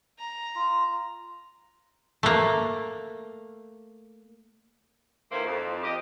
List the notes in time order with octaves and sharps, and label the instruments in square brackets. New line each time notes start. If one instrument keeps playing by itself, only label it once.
[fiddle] A#5
[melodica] F4
[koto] A3 A#3
[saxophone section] A2 D#3 E3 A#3 C4 C5
F2
G4 D#5